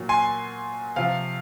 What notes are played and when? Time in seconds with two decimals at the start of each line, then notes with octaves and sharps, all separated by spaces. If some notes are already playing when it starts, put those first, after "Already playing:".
Already playing: A#2 F#3
0.09 G#5 C6
0.96 C3 F3 F5